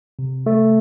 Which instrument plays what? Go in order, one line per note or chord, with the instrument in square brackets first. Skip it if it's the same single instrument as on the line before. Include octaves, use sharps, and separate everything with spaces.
[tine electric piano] C3
A3